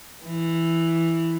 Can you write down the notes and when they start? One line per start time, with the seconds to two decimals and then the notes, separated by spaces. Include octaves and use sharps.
0.25 E3